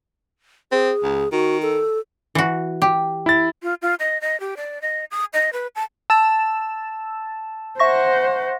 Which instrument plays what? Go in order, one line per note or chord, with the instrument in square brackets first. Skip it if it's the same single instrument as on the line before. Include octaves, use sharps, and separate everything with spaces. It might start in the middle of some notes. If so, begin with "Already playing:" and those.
[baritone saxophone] C4 [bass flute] G#4
[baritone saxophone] C#2
[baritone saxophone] D#3 [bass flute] F#4
[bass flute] A4
[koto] E3 F#4
G4
[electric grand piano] E4 A6
[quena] F4
F4
D#5
D#5
G4
D5
D#5
D#6
D#5
B4
A5
[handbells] A5 [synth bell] E6 A6 E7
[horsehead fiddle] C5 F#5 [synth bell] E5 C#6 A#6